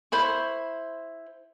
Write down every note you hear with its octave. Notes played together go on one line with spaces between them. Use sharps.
E4 C5 B5 C#6